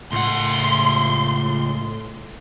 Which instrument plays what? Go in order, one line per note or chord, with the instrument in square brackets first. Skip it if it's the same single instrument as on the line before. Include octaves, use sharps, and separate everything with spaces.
[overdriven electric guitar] C#2 F#5 [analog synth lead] A2 [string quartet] C6